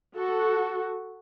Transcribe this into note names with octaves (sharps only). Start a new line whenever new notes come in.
F#4 A4